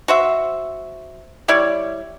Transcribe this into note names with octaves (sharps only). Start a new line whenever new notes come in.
F#4 C5 E5
G3 E4 C#5 D5